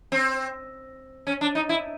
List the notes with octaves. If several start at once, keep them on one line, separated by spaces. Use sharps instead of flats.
C4
C#4
D4
D#4
E4